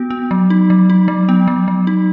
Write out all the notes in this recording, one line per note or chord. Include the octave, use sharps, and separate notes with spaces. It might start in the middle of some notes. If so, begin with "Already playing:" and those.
Already playing: B3 F#4
B3
F#3
D#4
F#3
D#4
F#3
B3
F#3
F#3
D#4